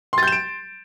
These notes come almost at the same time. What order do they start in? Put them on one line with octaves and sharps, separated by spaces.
C6 A6 G6 E7 D7